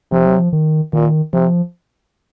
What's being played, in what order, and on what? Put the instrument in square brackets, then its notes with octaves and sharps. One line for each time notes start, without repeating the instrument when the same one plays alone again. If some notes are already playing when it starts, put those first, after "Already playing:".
[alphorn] C3 [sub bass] F3
[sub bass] F#3
F3
D#3
[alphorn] A#2 [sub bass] D#3
[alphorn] C3 [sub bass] F3